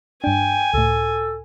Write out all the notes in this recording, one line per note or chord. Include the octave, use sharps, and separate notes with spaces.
G2 D4 G5 G#5
C#2 A2 A4